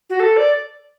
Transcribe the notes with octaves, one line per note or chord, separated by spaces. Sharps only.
F#4
A4
D5